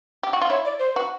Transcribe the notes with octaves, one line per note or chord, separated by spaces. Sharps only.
G4
F#4
F4
E4 C#5
D5
C5
F#4 B4